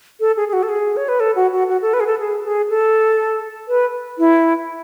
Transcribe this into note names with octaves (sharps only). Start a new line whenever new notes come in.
A4
G#4
G#4
F#4
A4
G#4
C#5
B4
A4
F#4
F#4
F#4
A4
B4
G#4
A4
G#4
G#4
A4
B4
E4